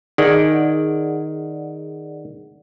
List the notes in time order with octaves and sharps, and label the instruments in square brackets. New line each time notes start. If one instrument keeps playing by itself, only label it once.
[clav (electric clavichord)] D#3 [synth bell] G#4 D5 F#5